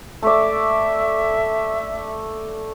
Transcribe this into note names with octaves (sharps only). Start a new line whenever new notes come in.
A3 D5 E5